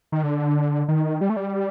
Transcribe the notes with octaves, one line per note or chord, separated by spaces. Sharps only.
D#3
D3
D#3
G3
A3
G3